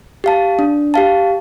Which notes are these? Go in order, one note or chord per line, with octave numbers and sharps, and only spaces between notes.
G4 F5 A5
D4
G4 F5 A5